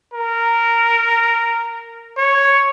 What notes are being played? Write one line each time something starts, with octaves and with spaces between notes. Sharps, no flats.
A#4
C#5